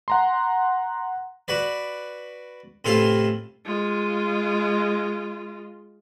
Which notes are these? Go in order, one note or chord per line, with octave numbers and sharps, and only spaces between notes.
F#5 A#5 C6
F#4 B4 D5
A1 C3 E3 F4 A4 C6
G#3 F4